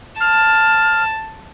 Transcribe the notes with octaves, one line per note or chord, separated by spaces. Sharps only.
A5 F6